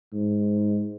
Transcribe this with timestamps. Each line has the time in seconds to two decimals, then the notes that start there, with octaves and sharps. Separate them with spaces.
0.13 G#2